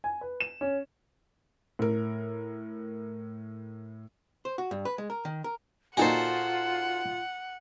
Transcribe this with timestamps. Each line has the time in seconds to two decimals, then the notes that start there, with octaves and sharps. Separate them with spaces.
0.04 G#5
0.21 B4
0.40 E7
0.61 C#4
1.79 A2 A#4
4.45 C5
4.58 F#4
4.71 G2
4.85 B4
4.98 G#3
5.10 A#4
5.25 D#3
5.44 A#4
5.97 A#2 D#4 F4 F#4 A4 C5 F#5 G#5